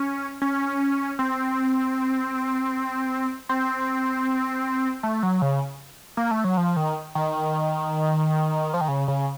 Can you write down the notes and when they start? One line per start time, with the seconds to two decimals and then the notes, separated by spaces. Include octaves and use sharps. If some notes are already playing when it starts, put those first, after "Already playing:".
Already playing: C#4
0.42 C#4
1.19 C4
3.49 C4
5.03 A3
5.23 F#3
5.42 C#3
6.17 A#3
6.31 A3
6.44 F#3
6.57 F3
6.77 D#3
7.15 D#3
8.74 F3
8.81 D#3
8.88 C#3
9.08 C#3